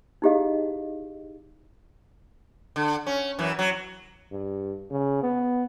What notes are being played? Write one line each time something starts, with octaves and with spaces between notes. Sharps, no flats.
D#4 E4 G4 G#4 D#5 F5
D3
C#4
F#2 E3
F#3
G2
C#3
B3